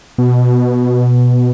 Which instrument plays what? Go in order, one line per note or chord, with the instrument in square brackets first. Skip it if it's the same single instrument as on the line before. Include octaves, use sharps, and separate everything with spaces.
[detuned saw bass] B2